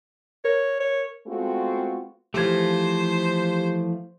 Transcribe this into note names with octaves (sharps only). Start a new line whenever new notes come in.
A#4 C#5
C#5
G#3 A3 B3 C4 F4 F#4
E3 F3 A3 G4 C5 G#6